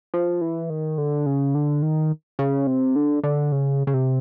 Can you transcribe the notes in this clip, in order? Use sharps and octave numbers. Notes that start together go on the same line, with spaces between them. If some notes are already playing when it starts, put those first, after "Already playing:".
F3
E3
D#3
D3
C#3
D3
D#3
C#3
C3
D3
D3
C#3
C#3
C3